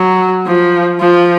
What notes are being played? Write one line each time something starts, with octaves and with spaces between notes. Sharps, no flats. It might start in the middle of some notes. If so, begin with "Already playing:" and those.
Already playing: F#3
F3
F3